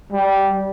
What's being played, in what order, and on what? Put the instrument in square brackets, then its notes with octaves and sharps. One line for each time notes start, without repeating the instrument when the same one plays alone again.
[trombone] G3